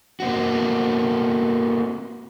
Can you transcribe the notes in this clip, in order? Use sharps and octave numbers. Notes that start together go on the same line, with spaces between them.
A#3 C4 F#4